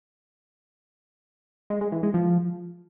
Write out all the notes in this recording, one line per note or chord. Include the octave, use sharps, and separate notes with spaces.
G#3
G#3
E3
G#3
F3